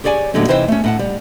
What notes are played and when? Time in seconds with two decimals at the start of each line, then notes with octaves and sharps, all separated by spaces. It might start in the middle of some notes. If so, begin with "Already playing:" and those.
0.04 G4 G#4 C#5 D5 F5 G#5
0.34 D#2 A2 D3 F#3 G3 C#4
0.48 C3 E3 D#4 C5 E5 G5
0.68 A3 C#4
0.84 A2 F#5 A5
0.99 G3